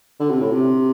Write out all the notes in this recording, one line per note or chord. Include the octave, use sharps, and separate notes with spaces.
D3
C3
A2
C3